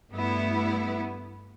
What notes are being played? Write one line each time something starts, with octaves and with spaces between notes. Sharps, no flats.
G2 A3 B3 E4